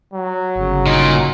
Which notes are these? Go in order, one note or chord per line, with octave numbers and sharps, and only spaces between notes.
F#3
G1 C#3
A#2 D#4